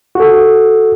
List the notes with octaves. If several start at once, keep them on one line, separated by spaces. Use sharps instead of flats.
F#4 A4